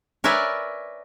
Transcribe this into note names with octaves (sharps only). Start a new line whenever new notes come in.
A#4 B4 C#5 D5 E5 G#5